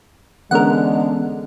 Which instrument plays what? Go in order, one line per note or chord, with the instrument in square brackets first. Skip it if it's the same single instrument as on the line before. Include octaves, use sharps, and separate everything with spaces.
[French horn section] D3 G#3 [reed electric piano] E3 B3 C#4 [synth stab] A#4 F#5